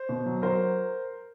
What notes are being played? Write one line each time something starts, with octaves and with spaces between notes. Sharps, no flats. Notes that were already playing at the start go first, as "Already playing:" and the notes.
Already playing: C5
B2
F#3
F#3 A#4 C5